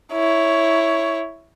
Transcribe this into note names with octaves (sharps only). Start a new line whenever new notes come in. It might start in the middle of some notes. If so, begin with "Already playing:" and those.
E4 C#5